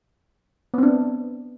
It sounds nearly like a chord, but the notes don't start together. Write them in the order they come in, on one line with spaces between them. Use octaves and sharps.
B3 C4 D4